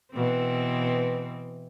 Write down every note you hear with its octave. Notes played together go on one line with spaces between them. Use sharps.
B2 E3 C4